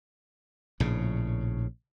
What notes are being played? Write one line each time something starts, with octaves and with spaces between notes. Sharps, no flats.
A#1 A2 C#3